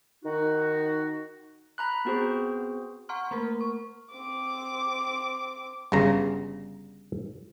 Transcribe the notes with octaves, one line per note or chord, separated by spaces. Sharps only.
D#3 D#4 F#4
A#5 B5 F#6
B3 C4 F#4 G#4 C5
F#5 A#5 C6 C#6 F6
A3 A#3 A#4
C#6
C4 D6
G1 G2 C#3 A#5